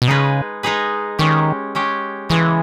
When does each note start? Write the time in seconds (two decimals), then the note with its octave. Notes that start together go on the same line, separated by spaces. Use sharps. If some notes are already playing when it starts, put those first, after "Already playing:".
0.02 B2
0.07 C#3 G#3 D#4 G#4 B4
0.63 G#3 D#4 G#4 B4
1.19 D#3 G#3 C#4 G4
1.75 G#3 C#4 G4
2.29 C#3 E3 G#3 B3